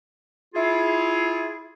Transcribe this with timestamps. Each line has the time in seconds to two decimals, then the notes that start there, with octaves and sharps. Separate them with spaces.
0.55 E4 F4 G#4